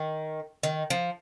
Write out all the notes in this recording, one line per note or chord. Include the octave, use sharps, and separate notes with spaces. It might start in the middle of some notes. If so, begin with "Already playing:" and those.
Already playing: D#3
D#3
F3